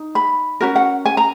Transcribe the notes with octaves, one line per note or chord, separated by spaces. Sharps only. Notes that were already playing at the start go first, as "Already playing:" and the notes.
Already playing: D#4
B5
C#4 F#4 A#4
F#5
G#5
A#5